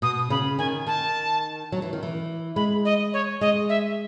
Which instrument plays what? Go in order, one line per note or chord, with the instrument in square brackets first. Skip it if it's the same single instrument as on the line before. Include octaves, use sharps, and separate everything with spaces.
[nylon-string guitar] B2 [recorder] D#6
[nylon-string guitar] C#3 [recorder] B5
[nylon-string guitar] D#3 [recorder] G#5
[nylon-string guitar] D#3 [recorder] A5
[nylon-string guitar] F#3
E3
D#3
E3
[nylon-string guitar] G#3 [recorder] B5
[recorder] D#5
C#5
[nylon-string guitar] G#3 [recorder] D#5
[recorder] E5